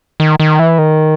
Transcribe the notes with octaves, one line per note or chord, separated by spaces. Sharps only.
D#3
D#3
E3
D#3